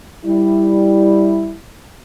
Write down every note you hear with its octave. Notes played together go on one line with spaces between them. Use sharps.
G3 E4